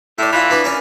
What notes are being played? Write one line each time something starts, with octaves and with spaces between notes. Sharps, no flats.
A2 E4 D5
E3 E4 F4 D5
B3 D4 F#4
C#4 A#4 D5